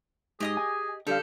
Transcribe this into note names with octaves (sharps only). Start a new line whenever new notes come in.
G#2 G4 G#4 D#5 D#6
G#5
D3 G3 G4 A4 F5 G6